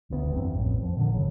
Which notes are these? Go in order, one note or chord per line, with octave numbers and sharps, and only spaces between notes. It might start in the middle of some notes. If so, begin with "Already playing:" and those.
E1 D2 B3
F#1 E2 G2 C4
A1 F2
F3
A#2 D3 D#3
G1 C#3 F#3